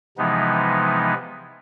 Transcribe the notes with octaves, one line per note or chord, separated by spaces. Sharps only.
C3 E3 F3 G#3 B3 D#4